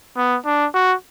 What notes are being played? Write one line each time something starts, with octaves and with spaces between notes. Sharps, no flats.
B3
D4
F#4